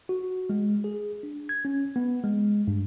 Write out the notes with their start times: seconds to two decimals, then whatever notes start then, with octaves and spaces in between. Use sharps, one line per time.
0.09 F#4
0.50 G#3
0.84 G#4
1.23 D4
1.49 G#6
1.65 C#4
1.96 B3
2.24 G#3
2.67 G2